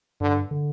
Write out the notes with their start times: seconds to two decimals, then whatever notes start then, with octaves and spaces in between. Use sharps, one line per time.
0.20 G2 D3
0.51 D3